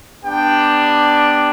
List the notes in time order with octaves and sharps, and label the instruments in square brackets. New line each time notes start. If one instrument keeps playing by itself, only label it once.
[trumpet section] B3 D4 G4 G5